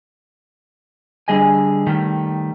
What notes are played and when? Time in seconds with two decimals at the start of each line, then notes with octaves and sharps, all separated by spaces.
1.28 D3 G3 G#4 D#5 G#5
1.87 D#3 G3 A3